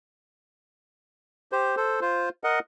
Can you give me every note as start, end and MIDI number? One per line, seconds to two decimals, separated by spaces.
1.52 1.76 67
1.52 1.76 72
1.77 2.00 69
1.77 2.00 72
2.01 2.29 65
2.01 2.29 72
2.44 2.59 70
2.44 2.59 75
2.44 2.59 78